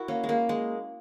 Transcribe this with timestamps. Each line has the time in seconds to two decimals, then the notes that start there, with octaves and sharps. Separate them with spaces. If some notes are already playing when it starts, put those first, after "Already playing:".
Already playing: E4 F#4 A#4
0.08 A#3 C#4
0.24 G#3
0.29 A#3
0.49 G#3